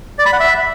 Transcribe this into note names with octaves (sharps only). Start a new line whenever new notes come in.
D5
B5
F#5
E5